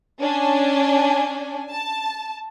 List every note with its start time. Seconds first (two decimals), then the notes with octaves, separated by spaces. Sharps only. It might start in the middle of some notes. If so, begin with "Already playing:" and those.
0.20 C#4 D4 G#5
1.71 A5